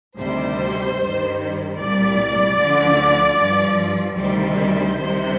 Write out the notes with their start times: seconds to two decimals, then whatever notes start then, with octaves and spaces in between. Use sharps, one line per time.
0.17 D2 C3 D#3 G3 C5
0.97 G2 D#3 G3
1.76 C2 A#2 G3 D5
2.57 D2 D3 F3
3.37 G2 F3
4.17 D2 C3 D#3 G3 C5
4.97 C2 C3 D#3 G3